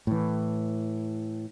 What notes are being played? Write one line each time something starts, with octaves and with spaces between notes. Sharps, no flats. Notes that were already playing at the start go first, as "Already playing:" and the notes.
A2 E3